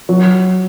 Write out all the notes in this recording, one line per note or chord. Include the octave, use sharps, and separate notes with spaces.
F#3